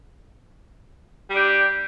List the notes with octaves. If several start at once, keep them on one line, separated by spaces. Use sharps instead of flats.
G3 D4 G4